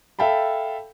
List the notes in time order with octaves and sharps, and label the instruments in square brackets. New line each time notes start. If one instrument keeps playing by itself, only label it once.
[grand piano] A4 E5 F5 G5 A5 B5